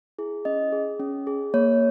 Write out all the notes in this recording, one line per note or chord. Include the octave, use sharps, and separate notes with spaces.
E4 G#4
C#4 D#5
G#4
C#4
G#4
A#3 C#5